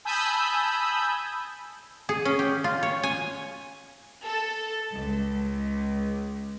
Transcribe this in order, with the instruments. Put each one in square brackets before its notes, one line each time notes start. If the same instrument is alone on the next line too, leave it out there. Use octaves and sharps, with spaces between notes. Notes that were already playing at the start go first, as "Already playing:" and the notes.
[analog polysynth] G#5 A5 B5 D#6 E6 G6
[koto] G#4
C#4
G4
F4
C#5
G#5
[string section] A4
C#2